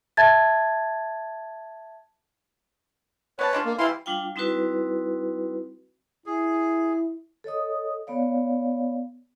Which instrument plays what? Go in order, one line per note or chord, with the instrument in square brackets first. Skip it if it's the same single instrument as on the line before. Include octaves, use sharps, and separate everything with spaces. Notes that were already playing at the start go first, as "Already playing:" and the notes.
[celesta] E5 A5 G#6 A6
[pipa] B3 D5 A5 [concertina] B4 C#5
[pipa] G#3 D4 F4
[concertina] A#3
[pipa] E3 G3 [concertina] E4 F5 C6
[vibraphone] G3 D4 F4 F5 G5
G3 C4 D#4 E4 F#4 B4
[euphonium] E4 [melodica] G#4
[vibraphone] A4 C#5 D#5 D#6
B3 C#5 D5 F5